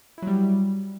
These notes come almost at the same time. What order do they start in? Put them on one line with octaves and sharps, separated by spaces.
E4 F#3 G3